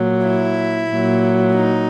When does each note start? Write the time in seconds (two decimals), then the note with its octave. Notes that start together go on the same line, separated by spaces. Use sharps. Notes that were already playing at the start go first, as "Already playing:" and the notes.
Already playing: A#2 F#3
0.28 E4
0.90 A#2 F#3
1.54 D#4